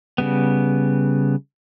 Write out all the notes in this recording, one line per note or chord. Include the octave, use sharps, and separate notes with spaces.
C#3 G3 B3